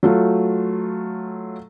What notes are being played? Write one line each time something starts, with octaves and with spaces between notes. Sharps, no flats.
F#3 A3 F4